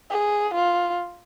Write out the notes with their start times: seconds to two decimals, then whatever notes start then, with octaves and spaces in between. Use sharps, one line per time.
0.10 G#4
0.54 F4